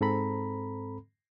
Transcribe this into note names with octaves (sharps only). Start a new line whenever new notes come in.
G#2 C4 A4 A#5 B5